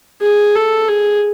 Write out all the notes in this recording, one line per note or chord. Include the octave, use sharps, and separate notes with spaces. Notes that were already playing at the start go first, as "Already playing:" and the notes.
G#4
A4
G#4